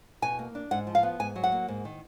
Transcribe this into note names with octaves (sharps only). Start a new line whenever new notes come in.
B2 G#5
A#3
D4
G#2 F#5
F3
F5
B3
G#2 G#5
F#3
F#5
A#3
G#2
D#3